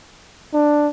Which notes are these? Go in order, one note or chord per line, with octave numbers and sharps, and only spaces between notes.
D4